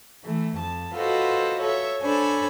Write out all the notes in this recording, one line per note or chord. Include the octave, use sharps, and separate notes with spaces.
E3 A3
F2 A5
F4 F#4 A4 B4 C5 D#5
A4 C#5 E5
D4 A4 C5 C#5 G#5 B5